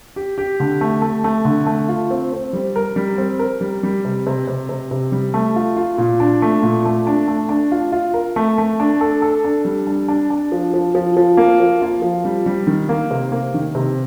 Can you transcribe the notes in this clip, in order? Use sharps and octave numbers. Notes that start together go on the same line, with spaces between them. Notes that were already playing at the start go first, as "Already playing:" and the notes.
G4
G4
D3
A3
A3
A3
D3
A3
F4
C4
C4
G3
A#4
G3
C4
A#4
G3
G3
C3
C3
C3
C3
C3
G3
A3
F4
F4
A#2
D4
A3
A#2
A3
D4
A3
D4
F4
F4
A#4
A3
A3
D4
A4
A4
D4
G3
D4
D4
D4
F3
F3
F3
F3
A#3
F3
F4
F3
G3
G3
D#3
A#3
C3
A#3
D#3
C3